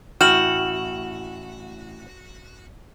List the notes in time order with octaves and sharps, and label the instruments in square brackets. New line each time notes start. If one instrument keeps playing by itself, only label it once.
[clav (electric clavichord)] A1 E4 G5 [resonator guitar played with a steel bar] F#4 [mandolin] F6 [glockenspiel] E7 F#7